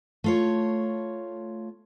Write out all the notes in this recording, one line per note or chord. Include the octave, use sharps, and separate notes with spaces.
A3 F4 C#5